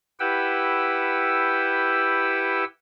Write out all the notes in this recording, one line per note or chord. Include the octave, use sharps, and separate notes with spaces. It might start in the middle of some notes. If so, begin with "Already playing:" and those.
E4 G4 B4 F#5 G5 E6